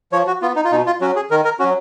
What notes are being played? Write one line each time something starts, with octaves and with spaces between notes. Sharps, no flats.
F3 C#5
F#4
B3 F4
D#4
F4
B2 D#4
F4
F#3 C#4 F#4
G#4
D#3 A#4
A#4
F#3 C#4 F#4